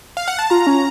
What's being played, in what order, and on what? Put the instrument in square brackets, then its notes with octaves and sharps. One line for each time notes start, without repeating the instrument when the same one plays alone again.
[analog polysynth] F5
F#5
A5
[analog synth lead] F4 [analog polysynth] A#5
[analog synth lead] C#4